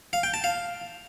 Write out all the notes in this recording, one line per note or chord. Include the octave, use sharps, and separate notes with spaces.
F5
G5
A5
F5